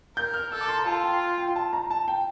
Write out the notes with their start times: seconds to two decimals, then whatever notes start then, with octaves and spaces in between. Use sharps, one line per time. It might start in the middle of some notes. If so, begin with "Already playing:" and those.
0.17 A#4 G6
0.34 F6
0.52 A4 E6
0.61 D6
0.68 C6
0.78 A#5
0.86 F4 A5
1.03 G5
1.38 G5
1.56 A5
1.73 A#5
1.90 A5
2.08 G5